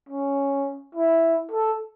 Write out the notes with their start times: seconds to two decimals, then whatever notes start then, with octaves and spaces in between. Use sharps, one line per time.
0.09 C#4
0.95 E4
1.51 A4